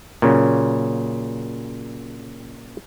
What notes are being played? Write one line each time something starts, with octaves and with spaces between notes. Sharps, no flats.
A#2 C#3 F#3